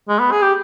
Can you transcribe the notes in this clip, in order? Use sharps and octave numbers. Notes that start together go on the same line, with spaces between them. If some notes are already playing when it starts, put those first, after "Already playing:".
G#3
B3
G#4
G4